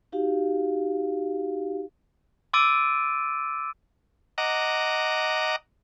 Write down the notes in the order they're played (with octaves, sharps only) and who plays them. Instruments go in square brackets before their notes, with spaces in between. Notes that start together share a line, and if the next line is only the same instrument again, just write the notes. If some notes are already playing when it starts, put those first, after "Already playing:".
[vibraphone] D#4 F#4 G4 F5
[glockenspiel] C6 D6 E6 A6 D7 D#7
[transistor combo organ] D#5 F#5 A#5 D6